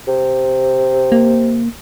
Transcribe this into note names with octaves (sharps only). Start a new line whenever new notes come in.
C3
A#3